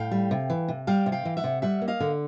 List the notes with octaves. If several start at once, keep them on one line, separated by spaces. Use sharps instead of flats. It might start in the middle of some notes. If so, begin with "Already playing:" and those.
Already playing: A2 F5 G5
G3
C3
E3
C3
G3 F5 G5
C3
F5 G5
E3
E5 F#5
C3
G3 E5 F#5
A#3
D#5 F5
D3